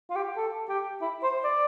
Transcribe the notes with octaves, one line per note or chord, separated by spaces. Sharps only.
F4
G4
A4
G4
E4
C5
D5